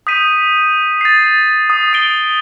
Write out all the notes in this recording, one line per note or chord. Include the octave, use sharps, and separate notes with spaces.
D#6 G6 B6 D#7
A6 C7
D#6
D#6 D7 G7